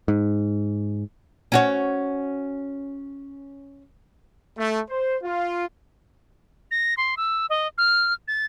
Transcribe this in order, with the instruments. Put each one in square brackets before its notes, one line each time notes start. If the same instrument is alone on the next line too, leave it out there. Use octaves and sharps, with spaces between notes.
[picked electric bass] G#2
[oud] C#4 F#4 C#5
[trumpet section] A3
C5
F4
[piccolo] A#6
C6
E6
D#5
F6
A6